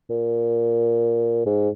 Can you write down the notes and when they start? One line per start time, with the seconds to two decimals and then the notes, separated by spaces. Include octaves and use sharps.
0.10 A#2
1.46 G#2